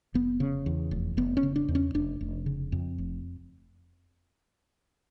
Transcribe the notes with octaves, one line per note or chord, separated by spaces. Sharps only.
F1 B3
C#3
E2
F1
F1 B3
C#4
C#3
D4
E2
C#4
F1 D4
F1
C#3
F2
F1